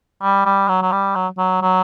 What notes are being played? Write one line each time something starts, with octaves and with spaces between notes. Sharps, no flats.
G3
G3
F#3
F#3
G3
F#3
F#3
F#3